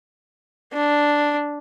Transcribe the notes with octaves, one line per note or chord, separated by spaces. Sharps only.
D4